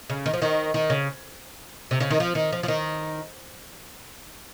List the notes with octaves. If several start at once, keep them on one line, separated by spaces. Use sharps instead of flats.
C#3
D#3
F3
D#3
D#3
C#3
C3
C#3
D#3
F3
D#3
F3
F3
D#3